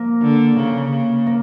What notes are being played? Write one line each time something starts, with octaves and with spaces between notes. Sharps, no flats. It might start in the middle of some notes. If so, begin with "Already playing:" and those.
Already playing: A#3
D3
C#3 A#3
C#3
A#3